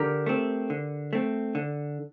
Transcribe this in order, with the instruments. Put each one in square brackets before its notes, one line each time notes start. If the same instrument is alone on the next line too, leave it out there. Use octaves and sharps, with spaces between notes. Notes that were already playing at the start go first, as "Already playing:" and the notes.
Already playing: [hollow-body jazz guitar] D3 [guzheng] G4 A#4
[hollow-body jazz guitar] A3 C4
D3
A3 C4
D3